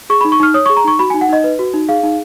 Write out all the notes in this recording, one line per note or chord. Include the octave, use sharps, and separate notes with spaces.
G#4 C#6
B5
D#4
C#6
D#4 F6
C#5 D#6
C#6
G#4
A#5
D#4 C#6
F#4 B5
G#5
D#4
F#5
D#4 D#5
B4
F#4
D#4
G#4 F5
D#4